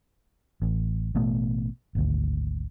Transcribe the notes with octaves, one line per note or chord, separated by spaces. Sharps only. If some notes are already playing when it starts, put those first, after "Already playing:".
A1
A1 B2 A3
G#1 D2